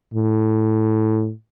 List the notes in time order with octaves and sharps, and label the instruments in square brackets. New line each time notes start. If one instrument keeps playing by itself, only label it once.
[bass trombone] A2